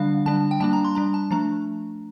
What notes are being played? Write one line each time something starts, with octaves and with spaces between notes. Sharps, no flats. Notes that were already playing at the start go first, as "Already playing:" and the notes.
Already playing: D3 G3 D4 F5
D3 G3 D4 A5
G5
G3 A#3 D4 A5
A#5
C6
G3 D4 A#5
A5
F3 A3 D4 A#5